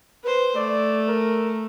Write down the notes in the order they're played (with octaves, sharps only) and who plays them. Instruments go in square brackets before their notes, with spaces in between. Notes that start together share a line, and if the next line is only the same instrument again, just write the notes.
[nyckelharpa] B4 C5
[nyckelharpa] A3 [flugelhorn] D5
[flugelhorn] A#4